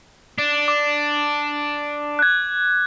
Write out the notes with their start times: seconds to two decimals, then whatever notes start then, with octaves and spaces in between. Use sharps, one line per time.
0.38 D4
0.68 D6
2.19 F#6 G#6